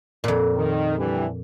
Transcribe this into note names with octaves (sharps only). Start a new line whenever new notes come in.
F2 A#2
D#3
D3 E3 G3